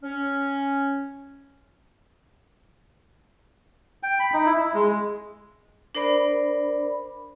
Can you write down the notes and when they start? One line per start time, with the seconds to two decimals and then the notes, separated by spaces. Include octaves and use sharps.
0.03 C#4
4.03 G5
4.19 B5
4.34 D#4
4.46 E4
4.58 E4
4.74 G#3
5.95 D4 A#4 C5 D5 B5